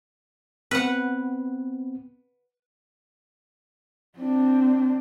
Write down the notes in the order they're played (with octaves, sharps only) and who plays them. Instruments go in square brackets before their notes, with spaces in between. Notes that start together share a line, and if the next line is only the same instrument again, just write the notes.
[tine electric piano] B3 C4 [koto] B4 F#5
[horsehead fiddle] C4 D4